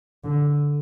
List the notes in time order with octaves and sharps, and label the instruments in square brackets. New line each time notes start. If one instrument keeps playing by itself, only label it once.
[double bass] D3